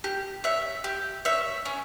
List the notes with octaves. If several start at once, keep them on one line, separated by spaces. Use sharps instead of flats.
G4
C#5 E5
G4
C#5 E5
C#4